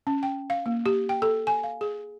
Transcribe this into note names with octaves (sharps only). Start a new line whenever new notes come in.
C#4
G5
F5
A#3
G4
G5
A4
G#5
F5
G#4